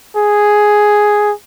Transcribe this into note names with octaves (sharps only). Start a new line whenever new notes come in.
G#4